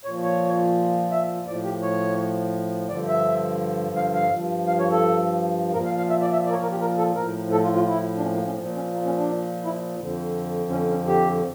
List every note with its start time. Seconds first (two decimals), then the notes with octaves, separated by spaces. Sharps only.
0.05 A#2 C#5
0.09 F3
0.23 C#5
1.12 E5
1.47 A2 F3 D5
1.64 G4
1.82 C#5
2.89 G2 D3 F3 D5
3.08 E5
3.96 F5
4.14 F5
4.31 G2 F3
4.68 F5
4.79 C#5
4.91 A4
5.74 A#2 F3 A#4
5.85 F5
5.98 F5
6.10 E5
6.21 D5
6.33 E5
6.45 D5
6.50 A#4
6.53 C#5
6.63 A#4
6.71 G4
6.81 A#4
6.98 A4
7.16 A2 F3 A#4
7.52 A4
7.64 F4
7.76 F4
7.88 E4
8.18 D4
8.23 C#4
8.34 A#3
8.46 C#4
8.58 A#2 F3
8.75 C#4
8.94 A#3
9.05 C#4
9.18 D4
9.65 E4
10.00 F2 D3 F3
10.71 C#4
10.90 C#4
11.07 G4